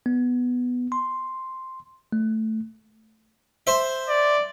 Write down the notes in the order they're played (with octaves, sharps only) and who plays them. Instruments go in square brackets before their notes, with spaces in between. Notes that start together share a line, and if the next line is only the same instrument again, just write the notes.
[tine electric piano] B3
C6
A3
[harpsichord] C5 E5
[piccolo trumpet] D5